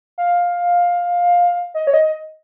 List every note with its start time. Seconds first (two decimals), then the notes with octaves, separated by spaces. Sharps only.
0.18 F5
1.74 D#5
1.87 C#5
1.94 D#5